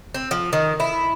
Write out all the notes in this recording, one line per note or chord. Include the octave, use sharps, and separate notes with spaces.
C4
F3
D#3
E4